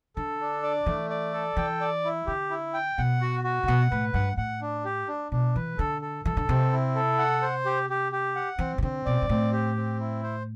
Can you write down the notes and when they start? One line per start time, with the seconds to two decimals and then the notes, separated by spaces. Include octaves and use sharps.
0.16 D3 A4
0.41 D4
0.63 D5
0.86 E3 A3
1.10 D5
1.33 A4
1.57 E3 G5
1.81 D5
2.05 E4
2.27 D3 G4
2.50 E4
2.74 G5
2.98 B2 F#5
3.22 F#4
3.44 F#4
3.63 C3
3.67 B2 F#5
3.91 A2 B4
4.14 G2 F#5
4.37 A2 F#5
4.61 D4
4.85 G4
5.08 D4
5.32 B2 D4
5.56 E3 B4
5.78 D3 A4
6.02 A4
6.25 E3 A4
6.37 D3
6.49 C3 C4
6.72 E4
6.95 A4
7.18 F#5
7.42 C5
7.65 G4
7.90 G4
8.12 G4
8.36 F#5
8.59 E3 C4
8.78 C3
8.82 D3 C4
9.06 B2 D5
9.22 G2
9.29 A2 C4
9.52 G4
9.76 C4
10.00 E4
10.23 C5